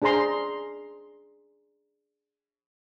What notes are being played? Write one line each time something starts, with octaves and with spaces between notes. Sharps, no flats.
D4 G#4 C5 A#5 C6